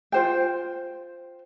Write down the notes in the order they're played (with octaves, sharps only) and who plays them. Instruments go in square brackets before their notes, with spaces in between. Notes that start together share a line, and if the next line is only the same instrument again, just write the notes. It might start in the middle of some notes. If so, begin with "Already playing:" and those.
[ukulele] F4 C5 G5